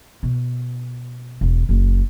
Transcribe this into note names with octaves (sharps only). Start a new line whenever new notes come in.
B2
E1
F#1